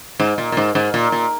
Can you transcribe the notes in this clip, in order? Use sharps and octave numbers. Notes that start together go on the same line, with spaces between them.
G#2
A#2
A#2
G#2
G#2
A#2
A#2